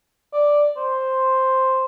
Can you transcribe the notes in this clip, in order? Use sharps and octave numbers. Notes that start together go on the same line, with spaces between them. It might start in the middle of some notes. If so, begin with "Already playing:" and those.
D5
C5